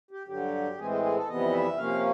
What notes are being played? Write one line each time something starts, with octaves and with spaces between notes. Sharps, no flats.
G4
G2 D3 F#3 G4
A2 E3 G#3 C4 G#4
G#4
G#4
A4
F2 C3 E3 G3 B3 D#5
E5
C3 F3 A#3 C#4 F5